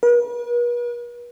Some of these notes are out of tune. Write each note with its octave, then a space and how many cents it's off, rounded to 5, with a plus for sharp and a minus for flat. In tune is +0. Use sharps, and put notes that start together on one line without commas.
B4 -45